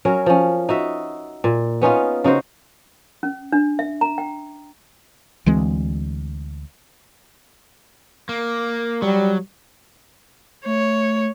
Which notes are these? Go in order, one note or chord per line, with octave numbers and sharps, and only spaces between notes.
F#3 C#4 A#4
F3 C#4
D#4 F#4 E5
A#2
B3 C#4 D#4 F4
C#3 D#4 F#4 C5
C#4
D4
E5
A#5
G5
D2 E3 G#3 C4
A#3
F#3 G3
A3 C#5